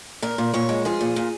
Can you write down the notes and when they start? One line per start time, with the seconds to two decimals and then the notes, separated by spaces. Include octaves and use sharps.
0.22 A#2 A#4
0.38 A#2
0.54 A#2 C#5
0.69 G#3
0.85 F3 G#4
1.01 A#2
1.16 A#2